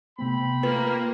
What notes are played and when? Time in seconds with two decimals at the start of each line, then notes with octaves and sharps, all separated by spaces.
0.19 C3 A3 B3 C4 B5
0.63 A#3 F4 B4